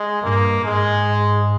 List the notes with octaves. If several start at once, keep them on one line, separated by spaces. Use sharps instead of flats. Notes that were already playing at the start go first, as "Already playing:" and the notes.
Already playing: G#3
G2 A#3
G#2 G#3